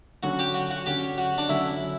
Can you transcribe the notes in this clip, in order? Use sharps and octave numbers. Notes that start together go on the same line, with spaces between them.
D3 F#3 C#4 F#4
G4
F#4
F#4
D3 F#3 C#4 G4
F#4
D4
D3 F#3 C#4 E4